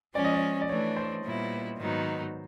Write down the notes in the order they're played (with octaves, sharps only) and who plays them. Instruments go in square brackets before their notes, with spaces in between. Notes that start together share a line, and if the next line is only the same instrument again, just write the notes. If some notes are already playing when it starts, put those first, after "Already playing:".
[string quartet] F3 G#3 C#4 [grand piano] D5
[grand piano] D#5
D5
D5
[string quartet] E3 A3 D4 [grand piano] C#5
[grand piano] C5
[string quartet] A#2 G3 B3 E4
G#2 D#3 F#3 B3 D#4